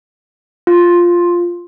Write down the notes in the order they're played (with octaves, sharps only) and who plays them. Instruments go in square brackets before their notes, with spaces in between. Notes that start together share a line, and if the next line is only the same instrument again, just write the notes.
[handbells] F4